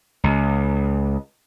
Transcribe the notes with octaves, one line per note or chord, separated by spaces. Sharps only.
C#2